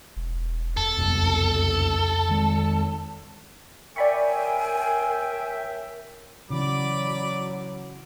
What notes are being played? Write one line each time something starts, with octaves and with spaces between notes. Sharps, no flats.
E1
E2 A4
F#1 C2 F2 B2
D#3 G#3
A#4 C#5 D5 E5 G5 G#5 B5 C#6
C#3 E3 F#3 D5 B5 D6